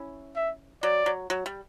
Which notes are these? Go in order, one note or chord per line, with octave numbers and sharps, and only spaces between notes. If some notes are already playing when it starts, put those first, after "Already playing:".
Already playing: C#4 E4
E5
F#3 D5
F#3
F#3
G3